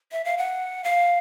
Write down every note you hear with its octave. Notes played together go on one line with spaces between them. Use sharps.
E5
F5
F#5
F5